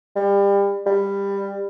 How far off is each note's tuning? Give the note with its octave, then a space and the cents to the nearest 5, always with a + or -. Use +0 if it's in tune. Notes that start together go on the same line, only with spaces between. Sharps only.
G3 +30
G3 +20